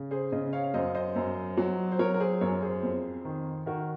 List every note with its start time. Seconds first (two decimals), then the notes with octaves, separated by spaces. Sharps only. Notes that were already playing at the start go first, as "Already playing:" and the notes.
Already playing: C#3
0.11 G#4 C5
0.32 C#3 C5 D#5
0.53 C#5 F5
0.64 F5
0.74 F#2 C5 D#5
0.95 C5 D#5
1.16 F#2
1.57 F#3
1.92 C5
1.99 F#3 A#4 C#5
2.14 A#4
2.20 G#4 C5
2.41 F#2 A#4 C#5
2.62 G#4 C5
2.83 F2
3.25 D#3
3.66 D#3 F#4 A#4